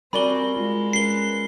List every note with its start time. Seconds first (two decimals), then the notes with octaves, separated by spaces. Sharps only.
0.13 G3 C4 F#4 A#4 D5 G#5 B5 G7
0.57 G#3 F4
0.93 C#4 A#4 B4 C7 G7